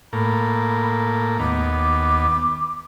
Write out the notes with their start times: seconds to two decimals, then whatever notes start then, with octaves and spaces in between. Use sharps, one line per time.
0.13 A2 A#3 B5
1.40 D#2 B3 D6